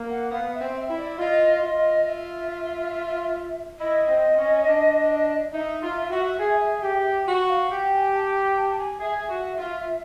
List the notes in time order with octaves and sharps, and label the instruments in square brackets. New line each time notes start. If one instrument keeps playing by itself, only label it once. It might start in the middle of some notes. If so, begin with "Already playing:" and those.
Already playing: [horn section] A#3
[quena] F#5
[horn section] B3 [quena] F5
[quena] E5
[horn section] C4
[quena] E5
[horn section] E4
[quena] D5
[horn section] F4 [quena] D#5
[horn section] F4 [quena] E5
[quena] D#5
E5
[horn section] E4 [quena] D#5
[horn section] C4
C#4
D4
[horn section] D#4 [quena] E5
[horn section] F4
F#4
G#4
G4
F#4
[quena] F5
[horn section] G4 [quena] F#5
[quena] G#5
A5
A5
A5
G#5
[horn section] G#4 [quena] E5
[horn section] F#4
F4